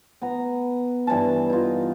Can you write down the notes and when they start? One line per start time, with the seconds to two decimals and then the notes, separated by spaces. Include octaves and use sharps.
0.22 B3 A#5
1.07 G2 E3 B4 A5
1.50 D#4 F4